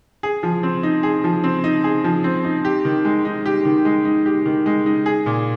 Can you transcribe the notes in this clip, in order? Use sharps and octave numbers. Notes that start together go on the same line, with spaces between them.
G#4
F3
C4
D#4
G#4
F3
C4
D#4
G#4
F3
C4
D#4
G4
D#3
G#3
D#4
G4
D#3
G#3
D#4
G4
D#3
G#3
D#4
G#4
A#2